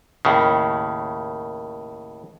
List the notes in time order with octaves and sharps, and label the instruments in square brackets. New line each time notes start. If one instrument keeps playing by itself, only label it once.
[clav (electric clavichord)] D#2 A2 C#3